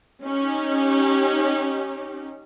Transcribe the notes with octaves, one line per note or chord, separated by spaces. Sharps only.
C#4 D#4 G4